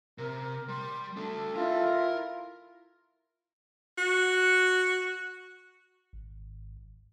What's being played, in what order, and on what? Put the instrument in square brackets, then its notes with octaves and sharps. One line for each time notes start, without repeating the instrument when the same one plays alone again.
[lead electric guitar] C3 [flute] A#4
[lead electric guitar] G3 [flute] C6
[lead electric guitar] A3 D4 [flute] A4
[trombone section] E4 F4 [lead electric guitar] A#4 E5
[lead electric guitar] A#4
[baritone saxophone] F#4
[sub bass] G#1